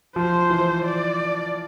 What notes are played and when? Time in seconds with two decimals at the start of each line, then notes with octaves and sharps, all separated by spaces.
0.16 F3 C5
0.50 E3
0.85 D5